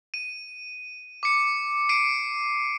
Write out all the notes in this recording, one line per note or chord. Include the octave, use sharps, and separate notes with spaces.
D#7
D6 C#7
C7 D7 D#7